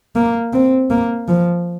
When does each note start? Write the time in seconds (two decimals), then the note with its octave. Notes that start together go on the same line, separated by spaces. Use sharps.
0.16 A#3
0.53 C4
0.90 A#3
1.28 F3